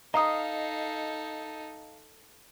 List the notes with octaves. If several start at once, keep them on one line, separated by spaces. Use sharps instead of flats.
D#4 A4 D#5 F5 A#5 D#6